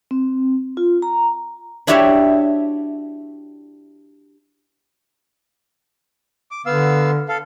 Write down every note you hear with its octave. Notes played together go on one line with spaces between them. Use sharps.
C4
F4
A#5
D4 E4 F#4 G4 C#5 E5
D6
D3 B3 F5 E6
A4 F5